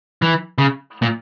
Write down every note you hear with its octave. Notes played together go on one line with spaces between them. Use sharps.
E3
C#3
A#2